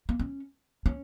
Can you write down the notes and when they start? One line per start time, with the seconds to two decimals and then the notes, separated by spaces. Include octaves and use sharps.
0.09 A#3
0.19 C#4
0.86 C#4